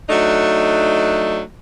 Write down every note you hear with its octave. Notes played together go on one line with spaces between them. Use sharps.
F#3 A3 D4 D#4